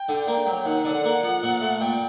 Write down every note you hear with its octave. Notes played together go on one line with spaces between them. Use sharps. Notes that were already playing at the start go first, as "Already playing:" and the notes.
Already playing: G5
D3
A#3
F#3
D#2 F#5
D3
A#3
F3
A#2
A3
A#2 G5